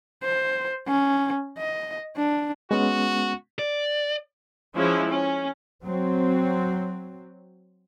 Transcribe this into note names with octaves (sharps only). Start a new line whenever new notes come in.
C5
C#4
D#5
D4
G#3 B3 C#4 F#4
D5
F3 G#3 C#4 E4
C#4
F#3 C4